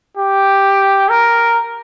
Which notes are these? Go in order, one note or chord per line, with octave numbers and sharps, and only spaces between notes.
G4
A#4